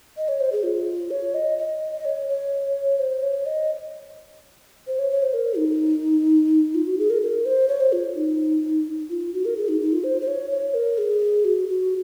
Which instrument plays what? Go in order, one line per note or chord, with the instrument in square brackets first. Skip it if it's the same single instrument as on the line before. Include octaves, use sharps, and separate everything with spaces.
[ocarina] D#5
C#5
C5
G#4
F4
C#5
D#5
D#5
D#5
C#5
C#5
C5
C#5
D#5
C5
C#5
C#5
C5
A#4
D#4
F4
F#4
G#4
A#4
A#4
C5
C#5
C5
F4
D#4
F4
F#4
A#4
G#4
D#4
D#4
F4
C5
C5
C#5
C#5
A#4
G#4
F#4
F#4